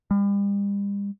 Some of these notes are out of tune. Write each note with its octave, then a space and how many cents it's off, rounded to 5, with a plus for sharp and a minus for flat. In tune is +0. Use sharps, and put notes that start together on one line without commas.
G3 +40